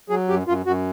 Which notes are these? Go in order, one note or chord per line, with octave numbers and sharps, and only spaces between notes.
F#3 G#4
F#2 G4
F#2 F4
F#2 F#4